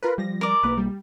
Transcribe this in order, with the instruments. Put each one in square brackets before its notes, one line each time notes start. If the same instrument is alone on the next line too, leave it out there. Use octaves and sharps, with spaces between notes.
[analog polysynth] F4 A#4 B4
[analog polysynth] F3 A#6 [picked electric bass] G3
[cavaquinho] A#4 D5
[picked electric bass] B1 A#3 [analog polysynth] B4
[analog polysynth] G3